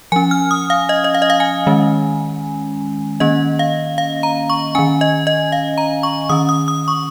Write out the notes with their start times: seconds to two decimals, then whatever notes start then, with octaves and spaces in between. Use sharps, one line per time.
0.12 F3 C#4 G#5
0.31 F6
0.51 D#6
0.70 F5
0.89 D#5
1.04 D#5
1.14 F5
1.22 D#5
1.30 F5
1.40 G#5
1.67 D#3 G#3 C#4
3.20 D#3 A#3 C#4 D#5
3.59 F5
3.98 F5
4.23 A#5
4.50 C#6
4.75 D#3 C#4 G#5
5.01 D#5
5.27 D#5
5.52 F5
5.78 A#5
6.03 C#6
6.29 D#3 C#4 D#6
6.49 D#6
6.68 D#6
6.88 C#6